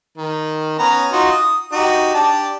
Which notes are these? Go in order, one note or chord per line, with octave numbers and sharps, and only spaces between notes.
D#3
B3 C#4 A#5
D#4 F4 F#4
D#6
D#4 F#4 G4
D4 G4 A5